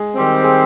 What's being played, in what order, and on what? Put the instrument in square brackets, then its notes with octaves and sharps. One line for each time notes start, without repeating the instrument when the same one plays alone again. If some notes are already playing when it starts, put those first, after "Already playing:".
Already playing: [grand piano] G#3 G#4
[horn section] D#3 G3 C4
[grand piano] G#4